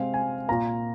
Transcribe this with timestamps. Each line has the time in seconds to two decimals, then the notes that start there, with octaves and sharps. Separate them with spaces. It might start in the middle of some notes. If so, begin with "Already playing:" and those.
Already playing: C3 G#3 C4 F5
0.14 G#5
0.49 A#2 A#3 A#5